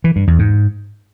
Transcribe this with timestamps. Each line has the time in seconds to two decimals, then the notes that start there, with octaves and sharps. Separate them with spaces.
0.04 E3
0.16 G2
0.27 E2
0.39 G#2